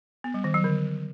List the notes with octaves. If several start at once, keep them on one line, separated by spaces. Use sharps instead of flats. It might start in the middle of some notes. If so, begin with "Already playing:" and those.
B3
G3
D#3
F#3
D3